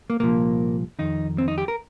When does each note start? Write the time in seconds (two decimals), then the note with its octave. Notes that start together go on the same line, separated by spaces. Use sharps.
0.10 A#3
0.20 C2 A#2 F3 A#3
0.99 F2 D#3 D#4
1.38 C4
1.48 D#4
1.58 G4
1.68 A#4